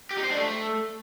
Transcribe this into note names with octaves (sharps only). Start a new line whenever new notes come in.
G4
D#4
C5
D4
A3